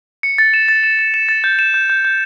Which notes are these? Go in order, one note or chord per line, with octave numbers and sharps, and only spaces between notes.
C#7
A6
E7
A6
E7
E7
E7
A6
G6
E7
G6
G6
G6